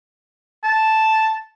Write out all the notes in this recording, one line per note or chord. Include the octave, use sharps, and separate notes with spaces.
A5